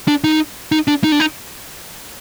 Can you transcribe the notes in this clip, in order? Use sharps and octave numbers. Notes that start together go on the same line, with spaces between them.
D4
D#4
D#4
D4
D#4
D4
D#4